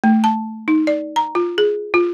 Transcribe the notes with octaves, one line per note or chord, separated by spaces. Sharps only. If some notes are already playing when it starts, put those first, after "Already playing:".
A3
A5
D#4
D5
A#5
F4
G#4
F4